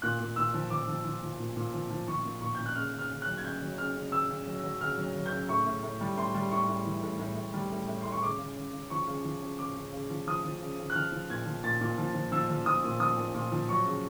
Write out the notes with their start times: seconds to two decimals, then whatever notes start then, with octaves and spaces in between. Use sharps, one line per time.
0.02 A#2 F#6
0.20 A#2
0.36 A#2 E6
0.54 F3
0.70 F3 D6
0.88 F3
1.05 F3
1.22 F3
1.40 A#2
1.56 A#2
1.74 F3
1.90 F3
2.08 F3 C#6
2.25 A#2
2.41 A#2 C#6
2.55 A#2 G6
2.66 F#6
2.75 C#3 F6
2.93 C#3
2.99 F6
3.10 C#3
3.22 F#3 F#6
3.37 G#6
3.44 C#3 G6
3.62 F#3
3.78 C#3 F6
3.96 C#3
4.12 C#3 E6
4.30 C#3
4.47 F#3
4.63 F#3
4.81 C#3 F6
4.97 F#3
5.15 F#3
5.26 G6
5.32 C#3
5.49 A2 C#6
5.66 A2
5.83 A2
6.01 G3
6.18 A2 C6
6.34 G3
6.51 A2 C#6
6.69 A2
6.85 E3
7.03 A2
7.19 A2
7.36 A2
7.54 G3
7.72 A2
7.88 A2
8.02 A2 C6
8.12 C#6
8.22 C#3 D6
8.39 C#3
8.56 C#3
8.73 C#3
8.90 F3 C#6
9.07 C#3
9.24 F3
9.41 C#3
9.59 C#3 D6
9.76 C#3
9.92 C#3
10.10 F3
10.27 F3 D#6
10.44 F3
10.61 C#3
10.79 C#3
10.90 F#6
10.95 F3 F6
11.12 F3
11.30 A#2 G#6
11.46 F3
11.63 A#2 A6
11.81 A#2
11.98 F3
12.15 F3
12.32 F3 E6
12.49 F3
12.66 F3 D#6
12.84 A#2
13.00 F3 D#6
13.17 A#2
13.34 A#2
13.52 F3
13.69 F#3 C#6
13.86 C#3